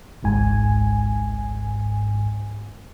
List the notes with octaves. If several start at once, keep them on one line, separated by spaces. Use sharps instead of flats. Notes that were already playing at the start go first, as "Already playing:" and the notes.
G#1 C#2 G#2 G#5